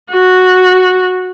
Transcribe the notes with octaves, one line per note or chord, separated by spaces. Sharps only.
F#4